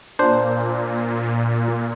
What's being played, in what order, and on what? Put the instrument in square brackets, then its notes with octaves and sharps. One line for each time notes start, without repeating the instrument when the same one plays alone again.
[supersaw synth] A#2 [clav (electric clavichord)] D4 C5